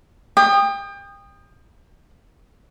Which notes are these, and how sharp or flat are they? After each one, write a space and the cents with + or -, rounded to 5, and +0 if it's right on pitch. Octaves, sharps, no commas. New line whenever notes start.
G5 +30 D#6 -15